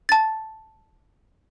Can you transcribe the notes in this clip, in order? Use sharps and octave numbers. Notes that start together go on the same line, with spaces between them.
A5 A6